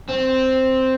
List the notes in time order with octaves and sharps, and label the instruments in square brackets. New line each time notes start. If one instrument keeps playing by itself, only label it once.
[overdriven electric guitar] C4